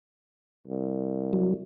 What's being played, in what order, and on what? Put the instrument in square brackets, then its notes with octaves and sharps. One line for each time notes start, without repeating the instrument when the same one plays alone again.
[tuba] C2
[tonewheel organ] F#3